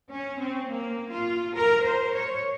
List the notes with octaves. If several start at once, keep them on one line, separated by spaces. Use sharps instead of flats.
C#4
C4
A#3
F4
A#4
C5
C#5